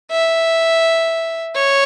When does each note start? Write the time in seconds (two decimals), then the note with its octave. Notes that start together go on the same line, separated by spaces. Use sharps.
0.11 E5
1.54 C#5